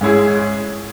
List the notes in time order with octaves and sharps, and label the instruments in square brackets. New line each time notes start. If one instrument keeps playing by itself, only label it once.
[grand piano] G#2 G#3 C#4 E4 G#4